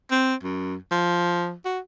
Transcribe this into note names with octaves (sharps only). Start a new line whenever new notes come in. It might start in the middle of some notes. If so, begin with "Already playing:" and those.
C4
F#2
F3
F#4